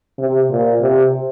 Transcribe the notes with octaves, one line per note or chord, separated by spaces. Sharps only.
C3
A#2
C3